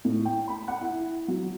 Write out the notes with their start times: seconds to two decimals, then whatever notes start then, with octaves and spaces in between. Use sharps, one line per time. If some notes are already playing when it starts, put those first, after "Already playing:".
0.05 A2
0.25 G5
0.48 B5
0.68 F#5
0.81 E4
1.28 F#3